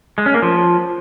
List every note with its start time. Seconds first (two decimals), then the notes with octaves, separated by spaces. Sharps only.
0.18 G#3
0.26 C#4
0.34 A#3
0.42 F3